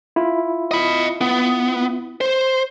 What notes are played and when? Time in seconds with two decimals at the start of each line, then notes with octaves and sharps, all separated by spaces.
0.16 E4 F4
0.71 D#5 B5
1.21 B3
2.21 C5